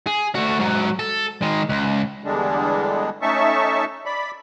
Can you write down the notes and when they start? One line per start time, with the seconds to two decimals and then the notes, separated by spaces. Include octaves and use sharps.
0.07 G#4
0.35 A3 F#4
0.59 G#2 F#3
0.99 A4
1.42 D#3 G#3
1.69 C#2
2.24 E2 D3 G3 G#3 D4
3.22 A3 C#4 D#4 E5 A5 C#6
4.06 D5 B5